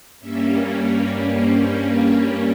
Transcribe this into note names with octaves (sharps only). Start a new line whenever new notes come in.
G2 G3 A#3 C#4 E5
C#5
C5
C#5